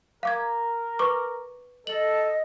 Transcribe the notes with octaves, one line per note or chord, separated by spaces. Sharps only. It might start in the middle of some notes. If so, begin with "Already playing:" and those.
A#4 F5 D6 G#6
B4 C#6 D6
A4 D#5 F#7